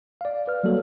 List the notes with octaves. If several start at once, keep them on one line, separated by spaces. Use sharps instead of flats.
D5 F5
B4 F6
F#3 G3 A#3 F#4 A4 C#5